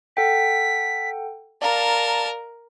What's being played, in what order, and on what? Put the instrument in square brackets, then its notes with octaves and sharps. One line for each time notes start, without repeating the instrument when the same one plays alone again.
[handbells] A4 F#5 G5 [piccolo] B6
[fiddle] A#4 [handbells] D5 F5 A#5 [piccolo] A5